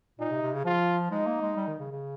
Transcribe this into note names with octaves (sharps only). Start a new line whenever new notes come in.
A#2 D#4
C3
C3
C#3
F3 F4
G#3 D#4
A#3
G#3
G3
D#3
C#3
C#3